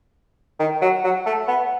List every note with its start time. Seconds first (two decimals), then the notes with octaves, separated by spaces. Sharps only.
0.59 D#3
0.82 F#3
1.04 F#3
1.26 A3
1.48 B3